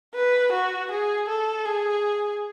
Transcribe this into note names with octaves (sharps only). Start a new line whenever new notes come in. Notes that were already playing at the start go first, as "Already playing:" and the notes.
B4
F#4
G#4
A4
G#4